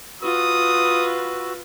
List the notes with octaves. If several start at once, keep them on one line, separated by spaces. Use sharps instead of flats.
F4 F#4 B4 D#6 E6